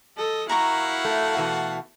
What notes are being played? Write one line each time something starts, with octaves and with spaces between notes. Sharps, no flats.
A4 D#5
E4 F#4 A#4 F5 F#5 A#5 C#6
A3
B2 E3 A3